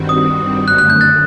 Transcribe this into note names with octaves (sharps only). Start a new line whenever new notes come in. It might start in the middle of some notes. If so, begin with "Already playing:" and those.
Already playing: G2 D#3 G3 C4 F#4
D#6
F#2 D3 A3 F#6
F#6
G6
F#6 A6